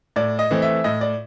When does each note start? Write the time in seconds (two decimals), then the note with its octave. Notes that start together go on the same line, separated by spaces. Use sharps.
0.16 A2 D5
0.39 D#5
0.51 E3 A3 C4
0.62 E5
0.84 A2 D#5
1.01 D5